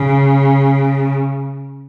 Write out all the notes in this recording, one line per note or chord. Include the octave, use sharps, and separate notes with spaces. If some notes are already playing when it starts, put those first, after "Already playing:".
Already playing: C#3